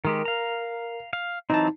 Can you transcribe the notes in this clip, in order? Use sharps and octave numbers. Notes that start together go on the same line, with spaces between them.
D#3 G#3 G4 A#4
F5 A#5
F5
E3 F#3 C4 D#4 A5